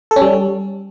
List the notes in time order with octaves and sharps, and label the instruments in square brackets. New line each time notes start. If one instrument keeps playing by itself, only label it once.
[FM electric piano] A4
C#4
G3